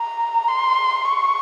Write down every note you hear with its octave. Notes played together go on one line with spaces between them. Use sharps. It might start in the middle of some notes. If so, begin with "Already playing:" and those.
Already playing: A#5
C6
C#6